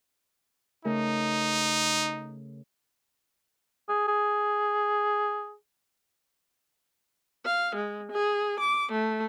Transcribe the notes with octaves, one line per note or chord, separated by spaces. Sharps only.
C#3 A3 D#4 A#4
G#4
G#4
F5
G#3
G#4
D6
A3